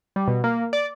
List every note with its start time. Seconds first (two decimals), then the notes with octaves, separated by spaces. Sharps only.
0.16 G3
0.28 B2
0.44 A#3
0.73 D5